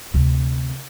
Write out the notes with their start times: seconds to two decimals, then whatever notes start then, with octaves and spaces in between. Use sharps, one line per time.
0.14 D2 C3